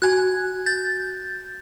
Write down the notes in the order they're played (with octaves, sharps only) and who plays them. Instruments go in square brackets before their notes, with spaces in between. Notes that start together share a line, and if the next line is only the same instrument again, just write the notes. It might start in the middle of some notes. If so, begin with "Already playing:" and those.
[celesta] F#4 G#5 [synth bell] F#6 G#6
[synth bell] G6 A6